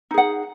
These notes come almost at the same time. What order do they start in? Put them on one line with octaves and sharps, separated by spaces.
D#4 G#4 F#5